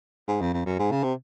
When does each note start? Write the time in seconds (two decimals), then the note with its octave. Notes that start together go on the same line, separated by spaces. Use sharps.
0.28 G#2
0.41 F2
0.53 F2
0.65 F#2
0.79 G#2
0.91 C#3
1.03 C3